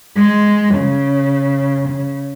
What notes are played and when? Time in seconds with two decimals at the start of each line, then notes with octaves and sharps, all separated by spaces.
0.17 G#3
0.74 C#3
1.89 C#3